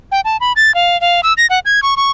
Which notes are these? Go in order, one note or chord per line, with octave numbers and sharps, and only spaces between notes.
G5
A5
B5
A6
F5
F5
E6
A#6
F#5
G#6
C#6
C#6